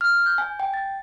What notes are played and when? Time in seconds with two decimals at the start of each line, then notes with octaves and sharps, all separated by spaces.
0.01 F6
0.26 G6
0.38 G#5
0.60 G5
0.74 A6